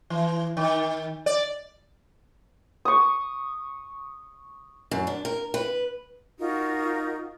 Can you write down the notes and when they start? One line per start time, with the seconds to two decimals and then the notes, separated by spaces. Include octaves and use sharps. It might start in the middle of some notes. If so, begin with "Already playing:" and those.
0.10 E3
0.57 D#3
1.26 D5
2.85 C#6 D#6
4.91 F#2
5.07 D4
5.25 A#4
5.54 B4
6.39 D#4 F4 F#4 A#4